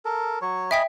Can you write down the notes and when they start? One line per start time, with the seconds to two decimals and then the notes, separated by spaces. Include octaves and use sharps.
0.05 A4 A#4
0.42 F#3 C#5
0.71 D#5 E5 G5 G#5 B5 B6